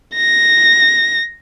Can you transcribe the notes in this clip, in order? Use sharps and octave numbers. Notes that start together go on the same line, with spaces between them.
A#6